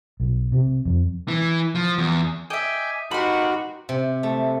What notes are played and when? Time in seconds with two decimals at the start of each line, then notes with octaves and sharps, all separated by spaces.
0.20 B1
0.52 C3
0.85 F2
1.28 E3
1.75 F3
1.98 E2
2.50 D#5 E5 G5 G#5 D6
3.11 D#4 F#4 G4 A#4 B4 B5 C6
3.89 C3
4.23 A3